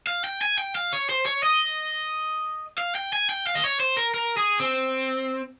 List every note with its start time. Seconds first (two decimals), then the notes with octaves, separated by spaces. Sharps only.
0.07 F5
0.24 G5
0.41 G#5
0.58 G5
0.75 F5
0.93 C#5
1.09 C5
1.26 C#5
1.43 D#5
2.78 F5
2.95 G5
3.13 G#5
3.29 G5
3.47 F5
3.55 D#5
3.64 C#5
3.80 C5
3.97 A#4
4.14 A#4
4.37 G#4
4.60 C4